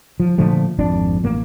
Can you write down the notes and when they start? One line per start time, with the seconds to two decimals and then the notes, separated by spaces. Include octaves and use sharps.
0.20 F3
0.38 A#2 D3 F3 A3
0.78 G#1 F2 D4
1.24 A1 A#3